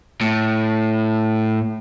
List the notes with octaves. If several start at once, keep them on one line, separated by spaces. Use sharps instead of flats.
A2